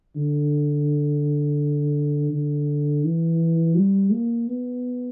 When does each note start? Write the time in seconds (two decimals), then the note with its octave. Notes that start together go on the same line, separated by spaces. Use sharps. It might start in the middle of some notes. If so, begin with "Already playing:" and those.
0.16 D3
2.32 D3
3.04 E3
3.76 G3
4.12 A#3
4.48 B3